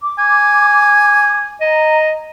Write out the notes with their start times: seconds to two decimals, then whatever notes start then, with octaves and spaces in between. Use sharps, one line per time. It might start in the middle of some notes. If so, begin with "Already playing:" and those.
0.01 D6
0.18 G#5
1.61 D#5 A#5